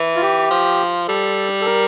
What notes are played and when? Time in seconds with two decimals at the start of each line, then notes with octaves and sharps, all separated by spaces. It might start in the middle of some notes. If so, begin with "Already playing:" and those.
Already playing: E3
0.16 F4
0.22 G4
0.51 F3
1.08 G3 A4
1.61 A4
1.65 A#4